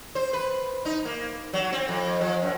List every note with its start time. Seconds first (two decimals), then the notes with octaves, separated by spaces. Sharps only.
0.15 C5
0.33 B4
0.85 D#4
1.05 A#3
1.53 F#3
1.72 C4
1.88 F2
2.21 F3
2.42 F#2